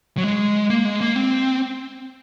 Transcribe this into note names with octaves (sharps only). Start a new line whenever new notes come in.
F#3
G#3
A#3
G#3
A#3
C4